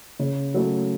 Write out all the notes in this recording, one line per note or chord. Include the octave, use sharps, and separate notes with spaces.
C#3
F#3 A3 C#4